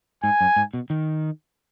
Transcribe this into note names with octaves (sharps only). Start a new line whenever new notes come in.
G#2 G#5
F#2
G#2
B2
D#3